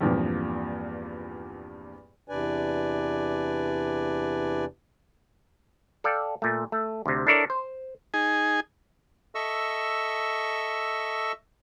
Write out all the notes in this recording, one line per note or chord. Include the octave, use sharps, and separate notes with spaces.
E2 G2 A#2 F3 C4
E2 C3 D4 B4 D5 G#5
A4 D5 F5 G5
A#2 A3
A3
D2 C3
D4 E4 A4 A#4 C#5 D5
C5
D#4 G#4 G#5
A4 D#5 E5 C#6 E6